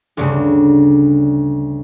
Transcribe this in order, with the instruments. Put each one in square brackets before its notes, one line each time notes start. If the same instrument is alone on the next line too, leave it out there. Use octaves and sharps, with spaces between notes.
[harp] D2 G2 C#3